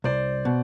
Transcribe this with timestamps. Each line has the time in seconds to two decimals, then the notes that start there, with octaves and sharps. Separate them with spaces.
0.04 C2 C5 D5
0.45 B2